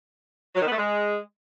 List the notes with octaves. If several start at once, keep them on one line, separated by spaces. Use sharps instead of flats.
F#3
D#3
B3
A3
G#3